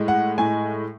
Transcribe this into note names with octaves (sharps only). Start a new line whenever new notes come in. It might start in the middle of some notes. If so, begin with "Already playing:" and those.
Already playing: A2 G#3
F#5
A2 G#5